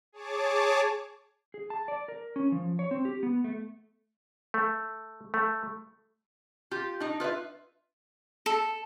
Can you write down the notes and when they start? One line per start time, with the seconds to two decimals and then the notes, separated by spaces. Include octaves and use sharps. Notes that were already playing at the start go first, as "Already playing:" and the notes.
0.12 G#4 C#5 A5 D6
1.54 G#4
1.70 A5
1.88 D5
2.08 A#4
2.36 C#4
2.52 F3
2.79 C#5
2.91 C4
3.05 G4
3.23 B3
3.44 A3
4.54 A3
5.34 A3
6.71 F4 G4
7.00 D4 D#4
7.20 F4 B4 C#5 E5
8.46 A4